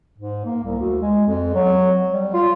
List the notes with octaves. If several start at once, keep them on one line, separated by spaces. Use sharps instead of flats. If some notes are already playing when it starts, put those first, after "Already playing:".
G#2
A#3
C2
D2
G#3
F2
F#3
G3
F4